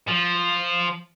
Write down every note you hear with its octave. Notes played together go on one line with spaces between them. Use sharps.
F3